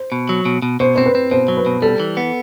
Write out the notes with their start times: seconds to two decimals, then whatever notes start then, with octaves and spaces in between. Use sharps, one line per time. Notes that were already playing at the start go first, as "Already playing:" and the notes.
Already playing: C5
0.12 B2
0.29 F#3
0.45 B2
0.62 B2
0.80 B2 C5
0.96 C4 C5
1.06 B4
1.15 C4
1.31 B2 C5
1.48 F#3
1.57 B4
1.66 B2
1.82 G3 A4
2.00 E3
2.17 B3